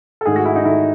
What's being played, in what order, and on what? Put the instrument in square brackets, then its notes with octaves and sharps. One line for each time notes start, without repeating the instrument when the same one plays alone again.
[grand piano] A4
G#2 D#3 A3 G#4
F#4
E4
D#4
G#2 D#3 A3 E4